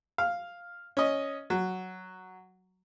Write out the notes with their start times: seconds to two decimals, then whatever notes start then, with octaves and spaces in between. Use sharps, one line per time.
0.18 F5
0.97 C#4 D#5
1.50 F#3